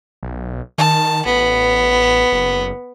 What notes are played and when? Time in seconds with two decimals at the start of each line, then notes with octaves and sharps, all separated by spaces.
0.23 B1
0.78 D#3 A5
1.26 A1 B3
2.32 F#1